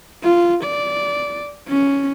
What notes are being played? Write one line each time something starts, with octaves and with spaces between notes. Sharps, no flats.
F4
D5
C#4